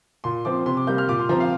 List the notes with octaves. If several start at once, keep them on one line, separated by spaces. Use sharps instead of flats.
A#2 C6
F3 C4 D6
C3 C6
D6
G3 A#3 G6
F6
A#2 D6
C6
F3 C4 A#5
F5